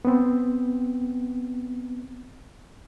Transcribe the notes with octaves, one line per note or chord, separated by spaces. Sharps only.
B3 C4